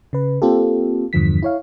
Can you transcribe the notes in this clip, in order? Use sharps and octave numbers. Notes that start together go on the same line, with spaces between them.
C#3 B4
A#3 C4 F4 G4 A4
E2 G2 D3 F3 B6
E4 C#5 F5